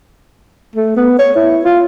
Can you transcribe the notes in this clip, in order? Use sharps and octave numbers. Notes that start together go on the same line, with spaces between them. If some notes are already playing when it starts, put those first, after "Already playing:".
A3
B3
C#5
E4
F4